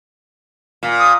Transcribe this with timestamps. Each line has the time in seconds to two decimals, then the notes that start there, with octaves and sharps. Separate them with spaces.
0.83 A#2
0.99 D#6